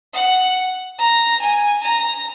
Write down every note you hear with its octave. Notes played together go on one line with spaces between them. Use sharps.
F#5
A#5
G#5
A#5